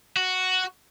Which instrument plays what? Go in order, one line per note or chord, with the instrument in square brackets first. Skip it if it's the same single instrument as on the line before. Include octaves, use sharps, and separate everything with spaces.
[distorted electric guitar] F#4